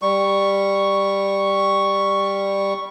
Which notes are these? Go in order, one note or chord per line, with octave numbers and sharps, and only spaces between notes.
G3 C#6